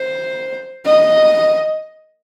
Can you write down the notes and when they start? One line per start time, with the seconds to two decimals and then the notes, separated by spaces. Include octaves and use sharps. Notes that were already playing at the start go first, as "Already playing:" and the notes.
Already playing: C5
0.85 D#5